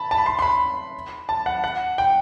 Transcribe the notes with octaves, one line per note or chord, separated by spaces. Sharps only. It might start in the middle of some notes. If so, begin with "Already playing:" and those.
Already playing: A5 B5
A5
B5
C6
C6
B5
A5
F#5
F#5
G5